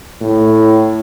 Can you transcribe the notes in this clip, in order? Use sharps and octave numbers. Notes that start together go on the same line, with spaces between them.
A2